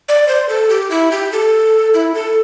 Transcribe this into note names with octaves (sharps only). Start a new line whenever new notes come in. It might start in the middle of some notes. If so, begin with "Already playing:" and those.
D5
C5
A4
G4
E4
G4
A4
E4
A4